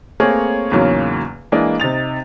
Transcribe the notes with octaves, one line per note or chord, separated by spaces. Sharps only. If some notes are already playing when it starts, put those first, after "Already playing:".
A3 A#3 C4 G#4 C#5
E2 G#2 C#3 F#3 A#3 C#4
E3 G#3 A#3 D4 D#5
C3 D#4 A6 F7